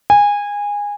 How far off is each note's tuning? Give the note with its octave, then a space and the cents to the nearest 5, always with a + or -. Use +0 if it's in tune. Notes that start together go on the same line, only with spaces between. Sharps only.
G#5 -20